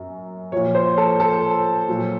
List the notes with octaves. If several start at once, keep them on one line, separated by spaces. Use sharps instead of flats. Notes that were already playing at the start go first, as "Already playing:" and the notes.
Already playing: F#2 F#3
A#2 F3 C#5
C5
A4
A4
A#2 F#3